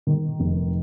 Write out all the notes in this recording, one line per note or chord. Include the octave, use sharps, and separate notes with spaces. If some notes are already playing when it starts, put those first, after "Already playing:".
D#3
F1